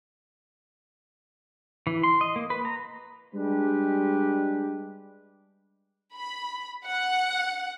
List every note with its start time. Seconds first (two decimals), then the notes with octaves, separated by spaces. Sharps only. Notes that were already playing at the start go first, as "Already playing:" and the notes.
1.87 E3
2.03 C6
2.21 D#5
2.36 A#3
2.50 B4
2.65 A#5
3.35 G3 G#3 D4 G4 B4
6.15 B5
6.85 F#5